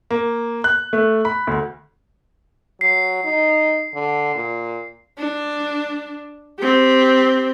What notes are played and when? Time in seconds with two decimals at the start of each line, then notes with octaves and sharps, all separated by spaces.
0.11 A#3
0.64 F#6
0.93 A3
1.25 B5
1.47 D2
2.81 F#3 C7
3.24 D#4
3.94 D3
4.35 A#2
5.18 D4
6.59 C4 G4